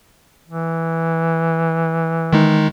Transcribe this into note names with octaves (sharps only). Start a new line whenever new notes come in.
E3
D#3 G#3 D#4